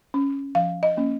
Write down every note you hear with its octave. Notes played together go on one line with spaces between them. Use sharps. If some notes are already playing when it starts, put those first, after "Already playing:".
C#4
F3 F5
D#5
A#3 C#4